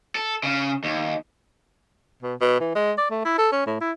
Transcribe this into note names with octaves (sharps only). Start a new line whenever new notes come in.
A4
C#3
D#2
B2
B2
E3
G#3
D5
A3
E4
A4
C#4
A2
E4